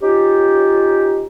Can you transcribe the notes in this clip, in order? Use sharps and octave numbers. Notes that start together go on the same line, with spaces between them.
C#4 D#4 F4 G4